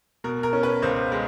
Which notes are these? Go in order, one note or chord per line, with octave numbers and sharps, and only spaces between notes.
B2 A#4
A#4
C#4
B4
C#2 C5
G#3